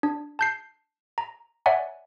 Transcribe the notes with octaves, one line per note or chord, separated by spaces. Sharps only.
D4
A5 G6 C7
A#5
C#5 D5 E5 F#5 G#5 A#5